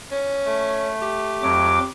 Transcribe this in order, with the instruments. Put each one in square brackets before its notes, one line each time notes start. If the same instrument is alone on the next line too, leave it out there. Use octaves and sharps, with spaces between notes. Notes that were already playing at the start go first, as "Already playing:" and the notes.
[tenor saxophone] C#4
[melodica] A3
[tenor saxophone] G4
[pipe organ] F2 F#3 D6